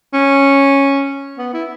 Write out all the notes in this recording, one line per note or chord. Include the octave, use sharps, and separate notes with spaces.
C#4
B3
E4